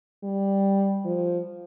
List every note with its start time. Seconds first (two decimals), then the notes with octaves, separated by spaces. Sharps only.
0.23 G3
1.05 F3